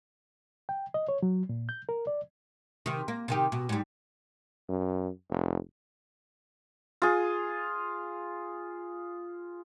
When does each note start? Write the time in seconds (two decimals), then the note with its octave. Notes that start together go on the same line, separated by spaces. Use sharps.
0.69 G5
0.94 D#5
1.09 C#5
1.23 F#3
1.49 A#2
1.69 G6
1.89 A#4
2.07 D5
2.86 C3 D#3
3.08 A#3
3.28 C3 D#3 G4
3.52 B2
3.69 G#2 G3
4.69 F#2
5.31 F1
7.02 F4 G#4